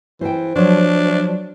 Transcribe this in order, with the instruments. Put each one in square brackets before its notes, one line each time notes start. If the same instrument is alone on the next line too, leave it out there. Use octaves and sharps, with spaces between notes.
[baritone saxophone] E3 [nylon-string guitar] C5 G5
[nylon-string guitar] F3 F#3 [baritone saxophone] D4